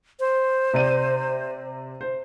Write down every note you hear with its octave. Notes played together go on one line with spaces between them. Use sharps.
C5
C3 D5 D#7
C5